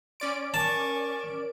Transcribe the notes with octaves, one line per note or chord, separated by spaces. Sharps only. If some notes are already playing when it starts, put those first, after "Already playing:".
C#4 D5 C6 D7
A#4 G#5 A5 C#6